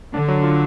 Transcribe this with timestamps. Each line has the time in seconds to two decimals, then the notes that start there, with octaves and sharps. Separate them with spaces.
0.14 D3 D4
0.28 F#3
0.43 F4